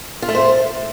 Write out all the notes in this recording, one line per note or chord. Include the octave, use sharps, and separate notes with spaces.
F4
A3
C5